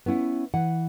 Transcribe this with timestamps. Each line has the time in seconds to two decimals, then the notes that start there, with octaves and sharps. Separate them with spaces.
0.06 B3 C#4 E4 F#5
0.54 E3 F#5